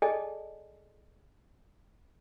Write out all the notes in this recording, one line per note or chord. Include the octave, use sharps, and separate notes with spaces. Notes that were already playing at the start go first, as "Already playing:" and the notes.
G#4 A4 D5 D#5 G#5 A5